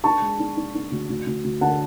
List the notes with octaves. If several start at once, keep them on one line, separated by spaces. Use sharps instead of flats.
D4 A5 C#6
G#3
D4
D4
D4
D2
D2
D2
D2
D3 F#5 A5